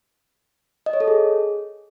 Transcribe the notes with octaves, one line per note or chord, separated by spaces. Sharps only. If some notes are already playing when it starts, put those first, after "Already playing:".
D#5
C#5
A4
G#4